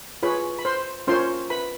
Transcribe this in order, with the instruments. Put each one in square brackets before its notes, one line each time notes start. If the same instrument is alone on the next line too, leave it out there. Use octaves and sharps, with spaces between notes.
[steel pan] F4 G#4 B4 C#5 B5
B5
C5 C6
C#4 F4 A#4 C5 C#5 C6
B4 B5